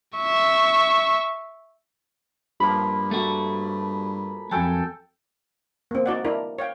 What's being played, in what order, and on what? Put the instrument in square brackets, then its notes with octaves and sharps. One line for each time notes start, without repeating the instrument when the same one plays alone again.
[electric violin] E5 C#6
[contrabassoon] G2 [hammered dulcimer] F3 A#3 [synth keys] B5
[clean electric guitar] A3 F#4
[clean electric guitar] F2 F#3 [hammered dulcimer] A4 G5 G#5
[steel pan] A#3 C4
D#4 F#4 D5 F#5
D4 E4 A#4
C#5 F5 G5